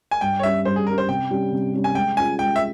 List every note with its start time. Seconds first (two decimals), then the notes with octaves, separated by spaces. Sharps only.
0.11 G#5
0.21 G2 G5
0.39 C#5
0.43 G3 C#4 G4 E5
0.65 G2 C5
0.76 G#4
0.87 G3 C#4 G4 A#4
0.98 C5
1.08 C3 G5
1.30 G3 C#4 G4
1.52 C3
1.74 G3 C#4 G4
1.84 G#5
1.95 G#3 G5
2.17 C#4 F4 G#4 G#5
2.39 G#3 G5
2.56 E5